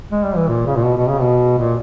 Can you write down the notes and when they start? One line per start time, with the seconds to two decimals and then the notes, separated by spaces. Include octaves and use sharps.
0.11 G#3
0.23 G3
0.36 E3
0.48 A#2
0.66 C#3
0.76 A#2
0.84 B2
0.97 B2
1.09 C#3
1.21 B2
1.58 A#2